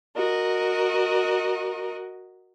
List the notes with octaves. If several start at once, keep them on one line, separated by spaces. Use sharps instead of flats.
F#4 A#4 D#5